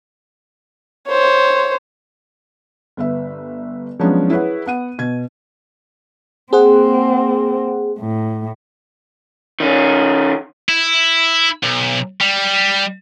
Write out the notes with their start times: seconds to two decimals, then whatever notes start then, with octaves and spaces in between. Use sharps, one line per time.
1.08 C5 C#5
2.97 G1 B4 E5
3.99 F3 F#3 G#3 B3 C#4 D4
4.30 E4 G#4 B4 C#5 F#5
4.66 B3 F#5 D#7
4.98 B2 G#6
6.53 A#3 C4 G#4 C5 F#5
7.99 A2
9.60 D#3 C#4
10.69 E4
11.64 B1
12.21 G3